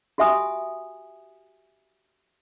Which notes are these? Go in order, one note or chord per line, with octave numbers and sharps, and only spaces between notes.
F#4 G4 E5 G#5 D#6